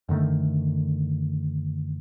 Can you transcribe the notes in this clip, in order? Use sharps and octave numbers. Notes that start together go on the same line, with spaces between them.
F#2 D3 D#3 A3